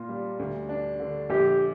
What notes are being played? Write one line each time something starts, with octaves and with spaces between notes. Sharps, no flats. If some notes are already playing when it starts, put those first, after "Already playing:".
Already playing: A#2 F4
G3
D2
D4
D3
A#1 G4